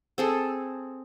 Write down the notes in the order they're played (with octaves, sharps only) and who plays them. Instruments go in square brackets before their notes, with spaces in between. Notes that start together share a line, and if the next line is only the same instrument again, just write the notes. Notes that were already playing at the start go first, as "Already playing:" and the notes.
[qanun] C4 G#4 A4